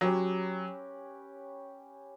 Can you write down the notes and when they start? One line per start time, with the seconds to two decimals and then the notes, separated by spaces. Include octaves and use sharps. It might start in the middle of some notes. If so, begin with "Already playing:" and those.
0.01 F#3 C#4 G4 B4